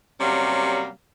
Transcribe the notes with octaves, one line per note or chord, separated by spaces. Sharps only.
C3 F#3 G3 A#3 C#4